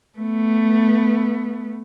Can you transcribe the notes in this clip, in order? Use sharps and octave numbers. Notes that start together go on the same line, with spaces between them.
A3 B3